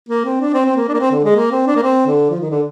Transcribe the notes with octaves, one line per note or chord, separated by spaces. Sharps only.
A#3
C4
D4
C4
C4
A#3
D4
A#3
C4
D3
G#3
A#3
C4
D4
A#3
C4
D3
F3
D#3
D3